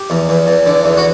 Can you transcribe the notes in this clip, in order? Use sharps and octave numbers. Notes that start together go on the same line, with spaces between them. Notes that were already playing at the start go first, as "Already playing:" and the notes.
Already playing: G4
E2
E2
E2
D3
E2
F#4